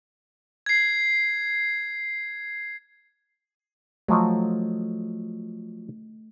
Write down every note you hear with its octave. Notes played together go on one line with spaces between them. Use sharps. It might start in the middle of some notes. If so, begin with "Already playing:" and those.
G#6 C7
F3 F#3 A3 D#5